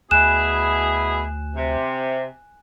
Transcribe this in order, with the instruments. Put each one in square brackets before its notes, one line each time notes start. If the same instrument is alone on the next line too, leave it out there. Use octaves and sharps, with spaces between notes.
[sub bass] D2 [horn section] B2 E4 G#4 [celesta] G#5 F#6 E7
[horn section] C3